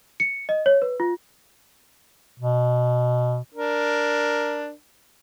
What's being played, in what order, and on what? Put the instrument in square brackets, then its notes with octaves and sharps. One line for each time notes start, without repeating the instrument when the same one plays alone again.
[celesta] C#7
D#5
C#5
B4
F4
[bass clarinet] B2
[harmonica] D4 A#4